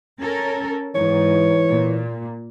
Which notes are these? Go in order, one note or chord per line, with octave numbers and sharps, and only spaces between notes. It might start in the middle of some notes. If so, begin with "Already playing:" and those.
C#4 A4 A#4
G#2 E3 C#5
A#2